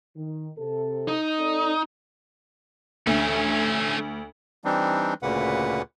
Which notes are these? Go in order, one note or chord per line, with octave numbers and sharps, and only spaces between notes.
D#3
C3 A4
D#4
C4 A4 D5
D2 A3 C#4
E3 G3 C4 D4 D#4
D2 A#2 C#3 B4 F#5